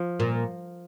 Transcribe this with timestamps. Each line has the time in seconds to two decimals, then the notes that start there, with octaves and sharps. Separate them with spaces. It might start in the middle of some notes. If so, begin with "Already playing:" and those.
Already playing: F3
0.20 A#2